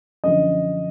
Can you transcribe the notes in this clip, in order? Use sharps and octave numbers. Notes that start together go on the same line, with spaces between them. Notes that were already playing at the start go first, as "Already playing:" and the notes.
F#2 D3 F3 D#5